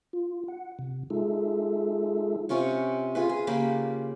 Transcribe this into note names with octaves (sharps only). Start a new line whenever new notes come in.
F4
F#5
C3
G#3 D#4 F4 G#4 A4 E5
C3 C#4 F4 C#5
F4 G#4 B4
G#4
C#3 A#3 G4 B5